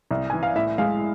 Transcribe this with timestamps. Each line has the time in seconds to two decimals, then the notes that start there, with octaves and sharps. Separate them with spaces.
0.11 C2
0.30 E3 G#5
0.43 F5
0.55 A2 E5
0.78 G#3 F5